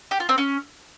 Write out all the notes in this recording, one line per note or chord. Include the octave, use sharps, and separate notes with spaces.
G4
F4
C4
C#4